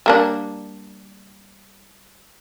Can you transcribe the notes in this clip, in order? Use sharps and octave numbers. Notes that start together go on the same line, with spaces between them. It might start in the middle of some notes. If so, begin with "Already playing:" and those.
G3 A#3 D4